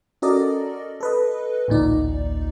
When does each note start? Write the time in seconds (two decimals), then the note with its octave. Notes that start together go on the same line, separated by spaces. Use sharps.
0.22 C#4 F#4 A4 A#4 D5 D#5
1.00 A4 B4 D#5
1.68 A1 D2 A#2 D#4 D5